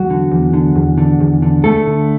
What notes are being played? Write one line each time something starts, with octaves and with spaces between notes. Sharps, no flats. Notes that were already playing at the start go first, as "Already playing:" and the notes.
Already playing: E2 F#3 F#4
D3
E2
D3
E2
D3
E2
D3
D2 A3 A4
D3